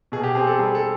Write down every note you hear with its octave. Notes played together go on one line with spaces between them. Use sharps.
B2 G#4
G4
C4 G#4
A4
G3 G#4
A4